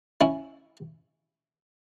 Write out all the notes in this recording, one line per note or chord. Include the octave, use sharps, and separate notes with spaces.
C#4 E4